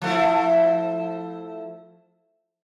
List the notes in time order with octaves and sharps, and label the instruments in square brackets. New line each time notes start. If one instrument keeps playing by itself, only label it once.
[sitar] F3 A3 E4